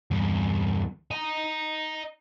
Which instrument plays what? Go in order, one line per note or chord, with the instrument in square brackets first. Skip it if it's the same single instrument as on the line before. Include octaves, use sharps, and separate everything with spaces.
[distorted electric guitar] E2 G2
D#5 A#5